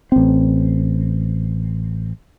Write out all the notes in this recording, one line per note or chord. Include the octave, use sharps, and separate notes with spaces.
A1 C4